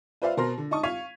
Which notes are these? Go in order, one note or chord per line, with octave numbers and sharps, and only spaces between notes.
F4 B4 C5 D5 E5 F5
B2 A#4 C5 C6 A#6
D3
D#4 D#5 A5 C#6 D#6
F5 C#6 G#6 B6 D#7 F7